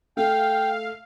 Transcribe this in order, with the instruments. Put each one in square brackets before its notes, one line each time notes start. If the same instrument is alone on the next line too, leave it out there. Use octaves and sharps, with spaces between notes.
[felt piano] A3 [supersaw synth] F5 [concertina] G5